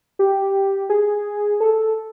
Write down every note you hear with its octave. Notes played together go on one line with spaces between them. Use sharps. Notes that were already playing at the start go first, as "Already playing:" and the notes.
G4
G#4
A4